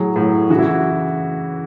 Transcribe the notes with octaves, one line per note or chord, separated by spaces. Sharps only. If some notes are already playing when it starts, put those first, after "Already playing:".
Already playing: A2 F#3 G#4
A2 F#3
C#3 E3 F#4
E4
F#4